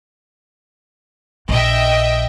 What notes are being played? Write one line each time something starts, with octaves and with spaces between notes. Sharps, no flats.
A#1 D#5 E5 G5